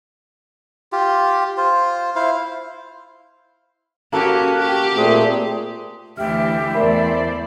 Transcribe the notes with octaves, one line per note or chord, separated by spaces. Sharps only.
F4 G4
F4 C5
E4 C5 F5
A#3 C#4 F#4 G4 A4 F5
G4
A#2 A3 C4 G#4
D2 E3 G4 E5 F6
E2 A3 A#4 C5 D5 A5 B5